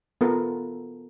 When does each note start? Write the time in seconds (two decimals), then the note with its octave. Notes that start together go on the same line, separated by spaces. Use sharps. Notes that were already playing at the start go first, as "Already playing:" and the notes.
0.21 B3 F4 A4 A#4